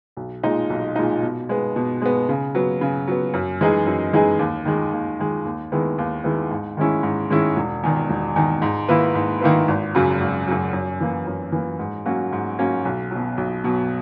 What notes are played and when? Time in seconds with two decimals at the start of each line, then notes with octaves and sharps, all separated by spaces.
0.17 B1
0.44 A#2 G#3 D#4
0.70 B1
0.96 A#2 G#3 D#4
1.22 B2
1.49 G#3 B3
1.76 B2
2.02 G#3 B3
2.29 C#3
2.55 F#3 B3
2.81 C#3
3.07 F#3 B3
3.34 F#2
3.61 E3 G#3 D#4 G#4
3.87 F#2
4.13 E3 G#3 D#4 G#4
4.39 D#2
4.65 D#3 G#3
4.92 D#2
5.19 D#3 G#3
5.45 D#2
5.72 D#3 G#3 B3 E4
5.98 D#2
6.24 D#3 G#3 B3 E4
6.51 G#2
6.77 D#3 G#3 C#4 E4
7.03 G#2
7.30 D#3 G#3 C#4 E4
7.56 E1
7.83 E2 D#3
8.10 E1
8.36 E2 D#3
8.62 G#2
8.89 D#3 A#3 E4 B4
9.15 G#2
9.41 D#3 A#3 E4 B4
9.68 G#1
9.95 F#2 C#3 F#3
10.20 G#1
10.48 F#2 C#3 F#3
10.73 F#2
11.00 E3 A#3
11.27 F#2
11.52 E3 A#3
11.79 G#2
12.05 F#3 A#3 C#4 F#4
12.32 G#2
12.58 F#3 A#3 C#4 F#4
12.85 B1
13.11 B2 F#3
13.37 B1
13.64 B2 F#3